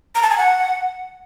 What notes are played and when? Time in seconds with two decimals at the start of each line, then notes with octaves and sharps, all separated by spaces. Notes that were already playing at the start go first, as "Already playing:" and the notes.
0.15 A#5
0.23 A5
0.30 G#5
0.38 F#5